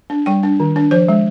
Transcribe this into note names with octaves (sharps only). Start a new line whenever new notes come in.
D4
G3 G5
D4
D#3
D4
F3 C5
G#3